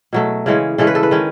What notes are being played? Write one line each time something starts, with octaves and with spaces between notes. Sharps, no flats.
B2 F#3 A3
C#3 E3 G#3 C#4
C#3 E3 G#3 C#4 A4
B4
A4
B4
D#3 G#3 C#4